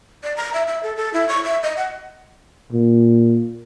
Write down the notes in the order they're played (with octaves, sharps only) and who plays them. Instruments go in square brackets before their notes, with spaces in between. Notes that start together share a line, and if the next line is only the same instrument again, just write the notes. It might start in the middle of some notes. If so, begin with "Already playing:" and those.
[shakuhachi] D5
A#5
E5
E5
A4
A4
E4
C#6
E5
D#5
F#5
[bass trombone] A#2